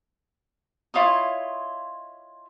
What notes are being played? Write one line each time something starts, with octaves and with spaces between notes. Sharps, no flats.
E4 F4 C#5 D#5